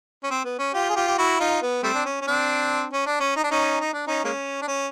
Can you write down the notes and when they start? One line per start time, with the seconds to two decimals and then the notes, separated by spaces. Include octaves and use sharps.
0.23 C#4
0.31 C4
0.44 B3
0.59 C#4
0.74 F4 G4
0.90 G#4
0.96 F4 G4
1.07 G4
1.18 E4 F#4
1.39 D#4 F4
1.62 B3
1.83 G3 A3 C4
1.94 D4
2.05 C#4
2.21 C#4
2.27 C4 D4
2.93 C#4
3.06 D4
3.20 C#4
3.37 D#4
3.44 D4
3.51 C#4 D#4
3.80 D#4
3.93 D4
4.07 C#4 D#4
4.24 G#3 A#3 C#4
4.62 D4
4.67 C#4